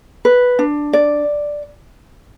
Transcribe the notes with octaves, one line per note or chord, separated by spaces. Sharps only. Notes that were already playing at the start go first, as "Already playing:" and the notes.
B4
D4
D5